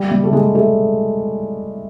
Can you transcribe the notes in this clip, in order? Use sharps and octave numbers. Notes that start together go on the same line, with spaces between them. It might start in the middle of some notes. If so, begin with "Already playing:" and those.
Already playing: G3
G3
A3
G#3
A3